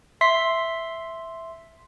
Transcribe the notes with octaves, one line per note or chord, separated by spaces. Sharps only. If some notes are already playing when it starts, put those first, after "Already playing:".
E5 C6 B6 C7